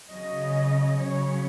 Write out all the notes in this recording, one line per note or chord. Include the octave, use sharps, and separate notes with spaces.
C#3 F#3 C#4 D#5
C#3 F#3 C#4 C#5